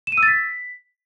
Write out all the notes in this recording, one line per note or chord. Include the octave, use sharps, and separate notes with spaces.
E7
D#7
E6
A6
B6